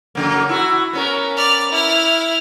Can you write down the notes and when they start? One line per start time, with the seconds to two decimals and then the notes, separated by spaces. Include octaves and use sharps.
0.15 F#2 C#3 A#3
0.49 E4 F#4
0.93 B3 C#4 A#4
1.37 D5 F6
1.71 E4 F6